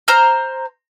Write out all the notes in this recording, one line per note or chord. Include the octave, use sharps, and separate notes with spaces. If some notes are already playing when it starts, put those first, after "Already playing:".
C5 A#5 F6